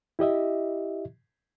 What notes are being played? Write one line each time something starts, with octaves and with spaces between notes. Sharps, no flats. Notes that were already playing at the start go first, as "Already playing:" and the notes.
E4 G4 D#5 E5